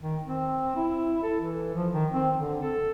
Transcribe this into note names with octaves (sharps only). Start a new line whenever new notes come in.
D#3
C4
E4
A4
E3
F3
D#3
C4
D3
A4